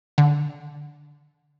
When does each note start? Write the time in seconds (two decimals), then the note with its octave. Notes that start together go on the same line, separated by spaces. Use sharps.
0.18 D3